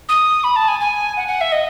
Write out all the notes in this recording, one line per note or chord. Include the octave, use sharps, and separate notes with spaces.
D#6
B5
A5
G#5
G#5
F#5
F#5
E5
D#5